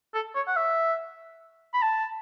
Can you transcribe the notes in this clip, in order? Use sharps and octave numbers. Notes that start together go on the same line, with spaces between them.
A4
C#5
F#5
E5
B5
A5